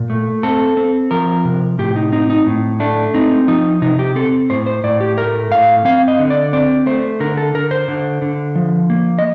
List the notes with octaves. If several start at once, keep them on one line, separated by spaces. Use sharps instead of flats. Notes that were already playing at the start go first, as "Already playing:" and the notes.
Already playing: A#2
A3
C4 A4
C4
F3 A#4
C3
A2 G4
D#4
C4 D#4
D#4
A2
A3 D4
C4 D#4
F3 D#4
C3 D#4
G4
C4 A4
A2 C5
C5
A2 D5
G4
A3 A#4
A2 F5
C4 F5
D#5
D3
D5
C4 D5
A3 C5
D3 A#4
A4
D3 A#4
C5
D3
D3
F3
A#3
D#5